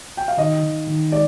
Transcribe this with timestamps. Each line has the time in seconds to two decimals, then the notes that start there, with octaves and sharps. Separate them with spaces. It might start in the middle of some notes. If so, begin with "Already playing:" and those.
0.17 G5
0.28 F5
0.37 D#3 D#5
0.63 D#3
0.87 D#3
1.12 G#3 D5